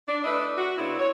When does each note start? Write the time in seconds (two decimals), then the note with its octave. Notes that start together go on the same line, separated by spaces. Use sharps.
0.08 D4
0.24 A3 D4 E4 B4 D#5
0.58 F#4
0.78 C#3 B3 C4 D4 E4
0.99 C#5